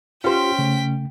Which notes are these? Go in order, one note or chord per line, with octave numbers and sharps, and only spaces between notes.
C#4 F4 G4 C5 G5 B6
C#3 A3